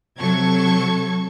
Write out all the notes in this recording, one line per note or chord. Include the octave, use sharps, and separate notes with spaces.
C3 F#3 A4 C#6 G#6